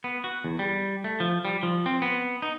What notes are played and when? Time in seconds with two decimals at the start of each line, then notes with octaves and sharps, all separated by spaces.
0.04 B3
0.24 F#4
0.44 E2
0.59 G3
1.04 A3
1.20 F3
1.45 G3
1.63 F3
1.86 C4
2.02 B3
2.42 D#4